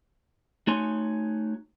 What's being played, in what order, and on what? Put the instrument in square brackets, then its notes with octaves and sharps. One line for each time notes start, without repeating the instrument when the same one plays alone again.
[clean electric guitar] A3 D#4 F#4 C#5 G#5 C6